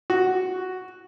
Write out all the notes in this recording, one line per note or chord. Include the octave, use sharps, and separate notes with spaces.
F#4